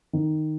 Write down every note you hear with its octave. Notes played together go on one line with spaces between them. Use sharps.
D#3